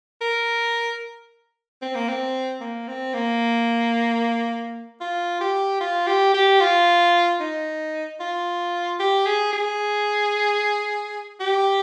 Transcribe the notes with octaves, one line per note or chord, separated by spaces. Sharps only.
A#4
C4
A#3
C4
A#3
C4
A#3
F4
G4
F4
G4
G4
F4
D#4
F4
G4
G#4
G#4
G4